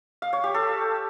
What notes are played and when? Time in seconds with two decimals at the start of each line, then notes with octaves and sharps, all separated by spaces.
0.22 F5
0.33 C#5
0.44 G4
0.54 A4